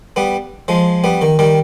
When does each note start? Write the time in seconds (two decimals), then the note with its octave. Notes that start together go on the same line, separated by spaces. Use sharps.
0.16 G3 B3
0.68 F3 G#3
1.04 G3 B3
1.22 D#3
1.39 D#3 G3